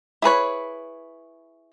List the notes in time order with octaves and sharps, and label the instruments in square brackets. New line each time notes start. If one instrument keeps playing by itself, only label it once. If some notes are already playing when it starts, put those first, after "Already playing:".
[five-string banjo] E4 G#4 B4 C#5